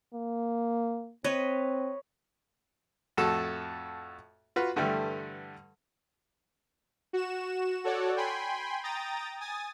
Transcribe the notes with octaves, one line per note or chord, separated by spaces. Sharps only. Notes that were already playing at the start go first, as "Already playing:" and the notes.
A#3
C4 B4 C#5 D#5
F2 A2 F#4 A4 A5
F4 F#4 B4
G2 D3 E3 G3 A3
F#4 E7
F#4 A4 C#5 D5 F#5
G5 G#5 B5 C6
G5 A#5 D#6 A6
G#5 D#6 A6